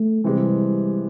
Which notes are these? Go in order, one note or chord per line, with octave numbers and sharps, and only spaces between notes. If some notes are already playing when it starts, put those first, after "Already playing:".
Already playing: A3
C3 E3 G3 G#3